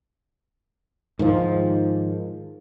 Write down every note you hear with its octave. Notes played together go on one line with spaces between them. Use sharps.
G#2 D#3 F3